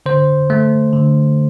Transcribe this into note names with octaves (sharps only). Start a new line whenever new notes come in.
D3 C5
A3
D3